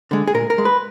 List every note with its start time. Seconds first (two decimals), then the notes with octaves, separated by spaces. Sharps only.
0.11 D3 G#3
0.27 G#4
0.34 A#2 A#4
0.50 A#4
0.58 G#3
0.65 B4